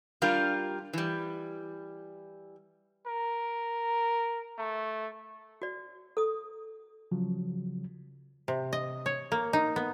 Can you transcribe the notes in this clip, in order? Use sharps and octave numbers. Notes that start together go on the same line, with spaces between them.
G3 D4 F4 G4 A#4
E3 G3
A#4
A3
F#4 D5
A4 D#6
C#3 F3 F#3
C3
D#5
C#5
A#3
D#4
B3